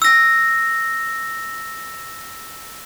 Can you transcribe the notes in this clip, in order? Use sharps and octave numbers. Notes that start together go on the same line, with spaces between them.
E6 A#6